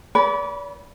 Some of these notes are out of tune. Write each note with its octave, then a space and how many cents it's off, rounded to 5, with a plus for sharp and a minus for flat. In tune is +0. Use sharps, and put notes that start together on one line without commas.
B4 -40 D5 -40 B5 +0